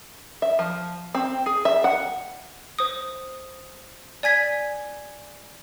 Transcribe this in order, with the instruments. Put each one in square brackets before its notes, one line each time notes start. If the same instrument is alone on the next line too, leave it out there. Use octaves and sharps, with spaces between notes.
[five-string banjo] E5
F3
C4
G#4
E5
F#5
[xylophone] C5 D#6
D5 G#5 G#6 B6